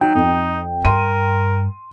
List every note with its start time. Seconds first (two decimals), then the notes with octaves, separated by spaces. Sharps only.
0.01 F#3 D#4 G5
0.15 F2 D#4
0.85 G2 A#4 C6 D#7